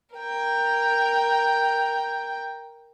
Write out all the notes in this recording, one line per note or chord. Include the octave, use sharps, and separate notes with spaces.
A#4 G5